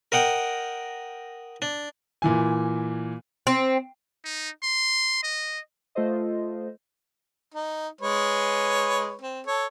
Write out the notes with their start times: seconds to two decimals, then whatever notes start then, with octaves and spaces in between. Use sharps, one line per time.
0.12 A#4 D#5 F#5 G5
1.62 D4
2.22 A#2 E3 G#5
3.47 C4
4.25 D#4
4.63 C6
5.23 D#5
5.95 A3 F4 A4 C5 D#5
7.54 D#4
8.01 G#3 B4 C#5
9.22 C4
9.47 A4 C#5